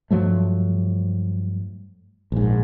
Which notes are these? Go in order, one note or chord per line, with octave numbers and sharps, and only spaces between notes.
G2 F3 F#3 A3
A#1 G#2